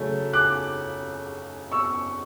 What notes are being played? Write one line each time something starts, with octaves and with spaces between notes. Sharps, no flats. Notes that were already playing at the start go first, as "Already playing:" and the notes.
Already playing: C#3 F#3 A3
D6 F#6
C#6 E6